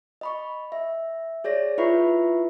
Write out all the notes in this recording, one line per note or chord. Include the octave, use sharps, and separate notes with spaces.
D#5 B5 C#6
E5
G#4 C#5 D5 A#6
E4 F4 B4 E5 B5 C#6